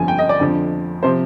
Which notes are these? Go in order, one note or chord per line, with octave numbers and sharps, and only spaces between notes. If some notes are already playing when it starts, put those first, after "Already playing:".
Already playing: G1 F2 D3 F3 G#5
G5
D#5
D5
F2 D3 F3
C3 F3 C5